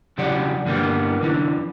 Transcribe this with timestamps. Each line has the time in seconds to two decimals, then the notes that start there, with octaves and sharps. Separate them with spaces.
0.18 E2 C#3 F#3 G4 D5 F#5
0.66 G2 D3 G3 A#3 B3
1.22 F#2 D3 E3